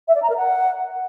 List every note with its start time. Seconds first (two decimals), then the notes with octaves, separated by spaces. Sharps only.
0.07 E5
0.15 D5
0.22 A#5
0.29 A#4
0.37 F#5